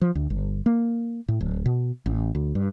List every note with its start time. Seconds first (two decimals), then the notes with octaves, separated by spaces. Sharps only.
0.01 F3
0.15 D2
0.30 G1
0.66 A#3
1.28 A2
1.41 D1
1.66 B2
2.06 A1
2.35 D2
2.55 G2